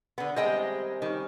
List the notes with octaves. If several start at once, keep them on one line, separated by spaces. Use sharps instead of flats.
D3 B3
C3 D#3 G3 G#3 D#5 G5
D#3 G3 C#4